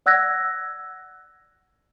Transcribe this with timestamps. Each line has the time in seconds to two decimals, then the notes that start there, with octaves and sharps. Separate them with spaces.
0.06 D5 F#5 E6 F#6 G#6 A#6